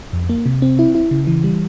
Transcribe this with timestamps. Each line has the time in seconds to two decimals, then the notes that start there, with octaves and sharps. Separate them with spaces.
0.13 F2
0.29 A#3
0.46 C3
0.62 C4
0.79 E4
0.95 E4
1.11 C#3
1.27 E3
1.44 G3